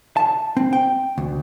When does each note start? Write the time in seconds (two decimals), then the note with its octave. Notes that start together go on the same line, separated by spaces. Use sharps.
0.17 A5
0.57 C4
0.73 G5
1.18 D2